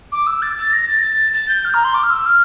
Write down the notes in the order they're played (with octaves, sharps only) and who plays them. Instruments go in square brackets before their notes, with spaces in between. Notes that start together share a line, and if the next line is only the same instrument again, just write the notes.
[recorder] D6
E6
A6
A6
A#6
A6
A#6
A6
A6
G6
F6
A#5
C6
D6
F6
E6
F6